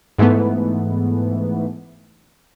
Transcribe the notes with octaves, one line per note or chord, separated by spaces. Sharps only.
G#2 E3 A3 B3